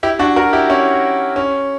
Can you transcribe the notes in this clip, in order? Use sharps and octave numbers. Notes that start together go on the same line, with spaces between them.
E4 G4
D4 F#4
F#4 A#4
E4 G4
C#4 E4
C#4